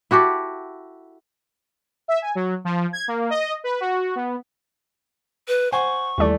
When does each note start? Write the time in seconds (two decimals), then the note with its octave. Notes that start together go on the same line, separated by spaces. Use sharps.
0.11 E4 F#4 G4 A4
2.08 E5
2.22 G#5
2.35 F#3
2.65 F3
2.93 G#6
3.08 A#3
3.30 D#5
3.64 B4
3.80 F#4
4.16 B3
5.48 B4
5.72 C5 F#5 G#5 C#6
6.18 D#2 E3 G3 A3 D5